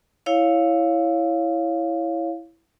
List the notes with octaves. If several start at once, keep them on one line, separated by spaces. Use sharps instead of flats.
E4 C#5 F5